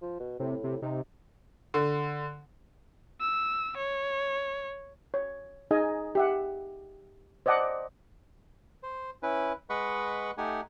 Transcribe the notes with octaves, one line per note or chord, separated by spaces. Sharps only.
F3
B2
A2 C3
C3
C3 D#4
D3
E6
C#5
C#5
D#4 G#4 D#5 G#5
G4 E5 F#5
C5 D5 D#5 F#5 A5 D6
C5
C#4 E4 B4
G#3 B4 D#5 F#5 B5 C#6
A3 D#4 G4 F#5 G#5